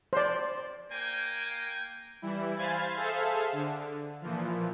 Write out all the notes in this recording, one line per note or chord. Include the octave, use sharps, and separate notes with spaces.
C5 D5
A#3 G5 G#5
E3 G3 E4
C5 F5 G#5 B5 G#6 A6
G#4 A4 C5 E5 F5 A5
D3
A#2 E3 F3